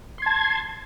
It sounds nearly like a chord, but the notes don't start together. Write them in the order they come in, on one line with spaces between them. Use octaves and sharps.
C6 G#6 A5